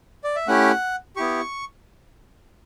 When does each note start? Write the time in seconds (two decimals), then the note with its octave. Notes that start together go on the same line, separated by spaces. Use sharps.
0.24 D5
0.36 E5
0.47 A3 C#4 E4 G4 F#5
1.16 B3 E4 G4 C#6